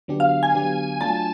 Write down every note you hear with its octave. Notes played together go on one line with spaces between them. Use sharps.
D3 F#3 B3 D4 G4
F5
G#5
D3 F#3 B3 D4 G4
F#3 A3 D4 F4 A5